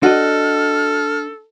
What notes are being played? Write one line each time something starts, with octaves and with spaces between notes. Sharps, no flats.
D4 F#4 A4 D#5 F6